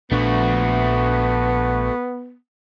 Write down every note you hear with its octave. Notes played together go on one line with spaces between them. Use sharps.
A#1 F3 A3 B3 D4 F#4